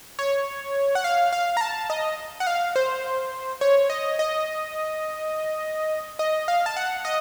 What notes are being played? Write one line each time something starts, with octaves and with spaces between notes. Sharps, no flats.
C#5
F#5
F5
F5
A#5
A5
D#5
F#5
F5
C5
C#5
D#5
D#5
D#5
F5
A5
F#5
D#5